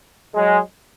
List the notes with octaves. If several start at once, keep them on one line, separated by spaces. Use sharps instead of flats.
F#3 G#3